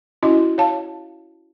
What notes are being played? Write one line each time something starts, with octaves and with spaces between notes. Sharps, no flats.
C#4 E4 F#4 D#5
C#5 F5 A5